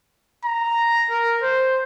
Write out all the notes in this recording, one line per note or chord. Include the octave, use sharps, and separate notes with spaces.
A#5
A#4
C5